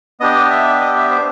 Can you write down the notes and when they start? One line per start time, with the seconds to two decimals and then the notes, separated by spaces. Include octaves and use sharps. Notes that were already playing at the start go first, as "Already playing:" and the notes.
0.20 B3 D4 G4 D#5
0.50 E5
0.81 D#5
0.96 E5
1.10 C5